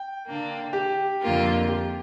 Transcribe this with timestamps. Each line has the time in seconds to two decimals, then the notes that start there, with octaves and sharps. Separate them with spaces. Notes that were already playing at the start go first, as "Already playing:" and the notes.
Already playing: G5
0.26 D3 A#3 D4
0.73 G4
1.21 F2 D3 A#3 F4 A#4
1.69 G4